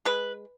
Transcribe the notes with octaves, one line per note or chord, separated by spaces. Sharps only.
G#3 B4